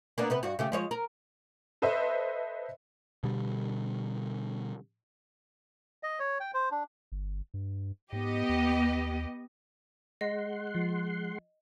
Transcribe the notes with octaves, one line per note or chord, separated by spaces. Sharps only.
A#3 B3 D4
C3 B3 B4
G2 F#4
C#3 A3 G4
F3 G#3 C#5
A#4
A4 B4 C5 D#5 E5
B2 D3 G3
D#5
C#5
G5
C5
D4
G1
G2
G#2 B3 G4 D#5
D#2
G#3 D#5 F#5 C6
F3